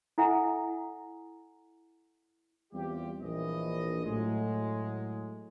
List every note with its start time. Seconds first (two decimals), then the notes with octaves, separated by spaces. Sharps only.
0.18 E4 A4 E5 F#5 G#5 A#5
2.72 E2 G3 C4 F4 G4
3.21 A#1 E3 D#5
4.05 A2 F#3 G#3